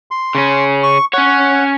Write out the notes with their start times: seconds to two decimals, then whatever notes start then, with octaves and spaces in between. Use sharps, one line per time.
0.11 C6
0.35 C#3 C#4
0.83 C#6
1.13 C#4 C#5 F#5